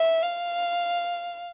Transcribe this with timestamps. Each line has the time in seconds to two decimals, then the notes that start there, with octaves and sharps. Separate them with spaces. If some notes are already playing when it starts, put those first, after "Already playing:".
Already playing: E5
0.23 F5